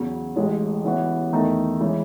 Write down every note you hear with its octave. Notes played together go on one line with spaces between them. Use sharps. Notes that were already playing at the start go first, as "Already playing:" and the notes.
Already playing: E2 C#3 F#3
A1 A2 G#3
C#3 E3 B3 F#4
E2 D#3 A3 D#4 A4
C#3 E3 G#3